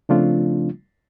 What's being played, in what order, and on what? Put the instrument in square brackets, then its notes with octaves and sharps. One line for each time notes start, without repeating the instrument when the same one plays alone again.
[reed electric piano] C#3 F3 A3 C4 D4 F4